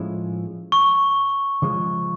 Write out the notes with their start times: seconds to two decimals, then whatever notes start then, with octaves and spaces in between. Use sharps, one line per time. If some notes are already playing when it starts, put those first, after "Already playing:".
Already playing: A2 F3 G#3 C#4 E4
0.72 C#6
1.62 C#3 F3 G#3